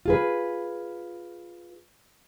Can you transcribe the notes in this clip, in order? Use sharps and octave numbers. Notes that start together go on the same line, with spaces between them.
F4 G#4 B4